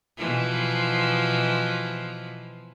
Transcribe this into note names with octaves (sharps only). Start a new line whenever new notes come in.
B2 E3 F3